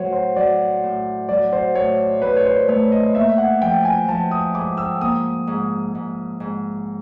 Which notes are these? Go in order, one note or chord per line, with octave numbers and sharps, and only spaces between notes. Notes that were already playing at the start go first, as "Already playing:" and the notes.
Already playing: A2 F#3 C5 C#5
C5
F#3 D5
A2
F#3 D5
C5
A2 C#5
A2 B4
C#5
C5
A3 C#5
D#5
A#3 E5
F#5
F3 G5
G#5
F3 A5
D#6
G#2 D6
E6
A#3 D#6
G#2
G#2
G#2